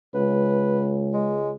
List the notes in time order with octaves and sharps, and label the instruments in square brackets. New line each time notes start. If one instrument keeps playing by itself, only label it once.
[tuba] C#2 [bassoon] B4
[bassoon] G#3